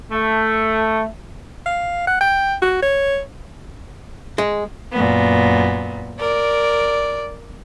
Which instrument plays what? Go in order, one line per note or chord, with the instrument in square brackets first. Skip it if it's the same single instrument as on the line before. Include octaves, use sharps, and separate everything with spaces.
[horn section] A3
[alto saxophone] F5
F#5
G5
F#4
C#5
[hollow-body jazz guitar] G#3
[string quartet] F#2 A#2 B3
[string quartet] A#4 [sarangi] D5